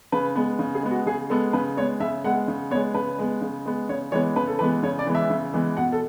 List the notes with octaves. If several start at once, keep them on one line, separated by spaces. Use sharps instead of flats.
C#3 B4
G#3 B3
C#3
G#4
G#3 B3
F#4
C#3 G#4
G#3 B3 A4
C#3 B4
G#3 B3 C#5
C#3 E5
G#3 B3 F#5
C#3
G#3 B3 C#5
C#3 B4
G#3 B3
C#3
G#3 B3
C#3 C#5
E3 G#3 B3 C#5
C#3 B4
A4
E3 G#3 B3 B4
C#3 C#5
D5
E3 G#3 B3
E5
C#3
E3 G#3 B3
B2 F#5
A4